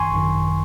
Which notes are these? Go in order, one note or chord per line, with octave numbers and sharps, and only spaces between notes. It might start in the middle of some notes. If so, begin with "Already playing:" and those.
Already playing: G#1 F#2 D#3 G#5 C6 C#6
G#1 F#2 D#3